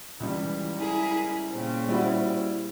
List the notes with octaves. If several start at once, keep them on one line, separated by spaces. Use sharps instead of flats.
C#2 E3 G3
E4 G#4 A#4
A#2 C#3 C4
G3 E4 F#4